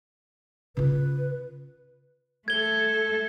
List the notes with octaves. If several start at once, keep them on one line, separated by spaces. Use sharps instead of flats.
C#3 F4 B4
A3 A4 G#6 G7